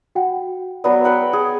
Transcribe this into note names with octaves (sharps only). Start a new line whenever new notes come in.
F#4 F#5 G5
F#4
F#3 B3 D5
B4 F#5 G5
G#4